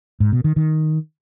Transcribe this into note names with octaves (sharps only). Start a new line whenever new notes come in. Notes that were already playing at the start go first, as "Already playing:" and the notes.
G#2
B2
D#3
D#3